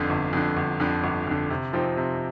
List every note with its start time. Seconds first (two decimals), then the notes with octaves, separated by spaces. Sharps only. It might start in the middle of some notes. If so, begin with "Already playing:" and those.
Already playing: G1 F2 D3
0.10 G1
0.33 F2 D3
0.57 G1
0.80 F2 D3
1.04 G1
1.27 F2 D3
1.50 C3
1.73 F3 C4 D#4 G4
1.97 C3